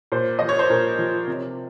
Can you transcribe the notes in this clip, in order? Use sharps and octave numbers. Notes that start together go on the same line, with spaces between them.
A#2 C5
F3 D#5
C#5
C5
A#2 A#4
F3
C3